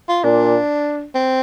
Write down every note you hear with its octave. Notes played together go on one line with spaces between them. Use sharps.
F4
A#2 D4
C4